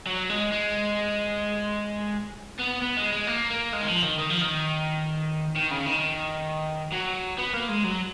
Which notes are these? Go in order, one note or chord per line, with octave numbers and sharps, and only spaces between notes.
F#3
G#3
G#3
B3
B3
G#3
G#3
A#3
A#3
G#3
D#3
F3
D#3
D#3
F3
D#3
D#3
C#3
D#3
F#3
B3
A#3
G#3
F#3